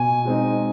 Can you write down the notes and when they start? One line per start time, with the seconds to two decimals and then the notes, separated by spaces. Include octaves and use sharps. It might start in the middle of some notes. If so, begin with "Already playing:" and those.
Already playing: B2 G#5
0.25 G#3 C4 D#4